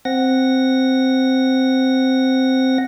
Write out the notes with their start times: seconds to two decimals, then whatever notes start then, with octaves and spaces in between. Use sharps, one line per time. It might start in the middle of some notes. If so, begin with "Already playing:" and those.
0.05 C4 F#5 A#6